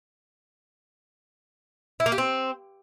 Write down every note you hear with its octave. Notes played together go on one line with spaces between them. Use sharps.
E4
A#3
G4
C4